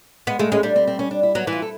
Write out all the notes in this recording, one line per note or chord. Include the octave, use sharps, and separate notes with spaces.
G#3 B3
G#3 A3
G#3 C#4
G3 D4
C4
C4
C#4
D4
E4
F#3 B3
E3
F4
A4